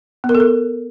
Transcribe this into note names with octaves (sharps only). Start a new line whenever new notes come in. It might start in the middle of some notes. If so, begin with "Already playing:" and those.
B3
A#4
A4
A#4